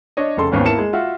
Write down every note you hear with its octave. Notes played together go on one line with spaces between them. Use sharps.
D4 C#5 D#5
F1 C#3 A4 C6
G#1 D#2 B3 C#4
A#3 E4 A5 C#7 E7
G#3
F4 F#4 E5